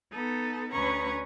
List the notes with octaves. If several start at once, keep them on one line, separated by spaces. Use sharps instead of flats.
B3 D#4 A4
D2 C#4 B4 A#5 C#6 D#6